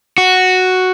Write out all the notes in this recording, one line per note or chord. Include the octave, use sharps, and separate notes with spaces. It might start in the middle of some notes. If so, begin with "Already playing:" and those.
F#4